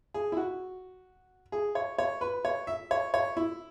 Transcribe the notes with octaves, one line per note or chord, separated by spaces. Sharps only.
G#4
E4
F#4
G#4
C#5
C#5
B4
C#5
E5
C#5
C#5
E4